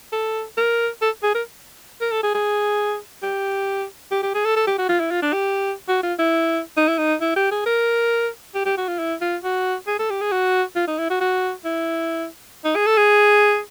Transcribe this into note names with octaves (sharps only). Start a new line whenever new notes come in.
A4
A#4
A4
G#4
A#4
A#4
A4
G#4
G#4
G4
G4
G4
G#4
A4
A4
G4
F#4
F4
E4
F4
D4
G4
F#4
F4
E4
D#4
E4
D#4
E4
G4
G#4
A#4
G4
G4
F#4
F4
E4
F4
F#4
G#4
A4
G4
G#4
F#4
F4
D#4
E4
F#4
F#4
E4
D#4
G#4
A4
G#4